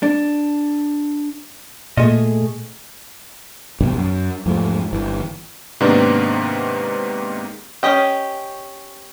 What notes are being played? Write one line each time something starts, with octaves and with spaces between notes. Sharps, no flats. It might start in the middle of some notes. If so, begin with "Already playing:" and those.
D4
A#2 A3 G#4 D#5
A#1 G2 B2 D#3
F#2
E2 G#2 F3 A3
G1 E3
G#2 C3 D#3 A#3 B3 D4
C#4 G4 D#5 G5